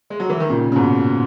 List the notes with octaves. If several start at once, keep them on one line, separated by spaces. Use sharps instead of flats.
G#3
F#3
E3
D#3
A#2 C#3
C#3
G#2 B2